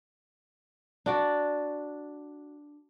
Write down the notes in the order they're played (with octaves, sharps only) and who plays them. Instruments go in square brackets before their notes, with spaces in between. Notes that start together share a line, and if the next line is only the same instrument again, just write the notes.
[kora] D4 F#4 D5